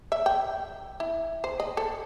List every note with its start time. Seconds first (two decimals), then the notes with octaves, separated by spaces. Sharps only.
0.12 E5
0.26 G5
1.00 E4
1.44 C5
1.60 D#5
1.77 A4